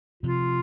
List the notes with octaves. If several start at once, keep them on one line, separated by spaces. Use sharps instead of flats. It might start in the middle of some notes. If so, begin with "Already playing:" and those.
C3 F3 F4